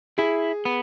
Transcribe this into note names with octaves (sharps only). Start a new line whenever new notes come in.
E4 G#4
B3